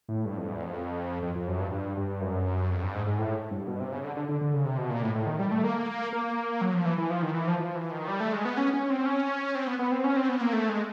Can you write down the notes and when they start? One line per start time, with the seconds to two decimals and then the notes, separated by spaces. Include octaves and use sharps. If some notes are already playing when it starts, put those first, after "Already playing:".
0.09 A2
0.25 G2
0.37 F2
0.50 E2
0.62 F2
1.23 F2
1.35 F2
1.48 F#2
1.60 G2
1.72 G2
1.97 G2
2.21 F#2
2.70 F2
2.82 G2
2.94 G#2
3.07 G#2
3.18 A2
3.51 G2
3.68 B2
3.80 C3
3.92 C#3
4.04 D3
4.16 D3
4.29 D3
4.41 D3
4.53 C#3
4.65 C3
4.78 B2
4.90 A#2
5.02 A2
5.15 A2
5.27 D#3
5.39 G3
5.51 A3
5.64 A#3
6.13 A#3
6.61 F#3
6.74 F3
6.85 E3
6.98 E3
7.10 F3
7.22 D#3
7.34 E3
7.47 F3
7.59 F3
7.75 E3
7.91 D#3
8.08 G3
8.20 A3
8.33 G#3
8.45 B3
8.57 C#4
8.73 C#4
8.90 C4
9.06 C#4
9.55 C4
9.67 B3
9.79 B3
9.92 C4
10.04 C#4
10.16 C4
10.29 B3
10.41 A#3
10.53 A3
10.69 G#3